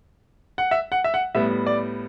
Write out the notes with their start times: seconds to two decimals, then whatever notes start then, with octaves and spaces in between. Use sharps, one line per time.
0.58 F#5
0.71 E5
0.92 F#5
1.04 E5
1.14 F#5
1.35 A2 G3 B3 E5
1.67 D5